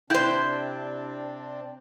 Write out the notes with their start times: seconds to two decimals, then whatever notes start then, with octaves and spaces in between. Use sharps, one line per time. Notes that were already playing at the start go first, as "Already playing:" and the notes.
0.10 C3 C4 D4 E4 C5 G5 F#6 G6